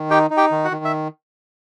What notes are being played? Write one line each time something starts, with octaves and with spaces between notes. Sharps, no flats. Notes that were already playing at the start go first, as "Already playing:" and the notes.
Already playing: D#3
D#4 G4 G5
D#4
G4 G5
D#3
F#4 F#5
D#3
E5